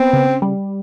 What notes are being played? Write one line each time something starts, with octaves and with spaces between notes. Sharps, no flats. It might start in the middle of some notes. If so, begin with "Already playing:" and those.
Already playing: B3 C4
C#3
G3